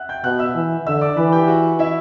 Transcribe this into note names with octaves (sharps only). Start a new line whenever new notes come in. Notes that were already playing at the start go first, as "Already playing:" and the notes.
Already playing: E5 F#5 F#6
G5 G6
B2 F#5 F#6
E5 E6
E3
D3 E5 E6
D5 D6
E3 B4 B5
G4 G5
F#4 F#5
E4 E5